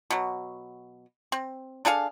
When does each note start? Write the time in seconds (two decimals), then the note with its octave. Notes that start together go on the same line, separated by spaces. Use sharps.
0.10 B2 F#3
1.32 C4
1.85 D4 G#4 A4 F5